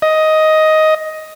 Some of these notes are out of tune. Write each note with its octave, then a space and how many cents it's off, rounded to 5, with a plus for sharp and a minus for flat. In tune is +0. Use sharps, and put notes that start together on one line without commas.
D#5 +10